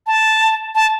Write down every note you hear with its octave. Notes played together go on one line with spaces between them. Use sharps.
A5
A5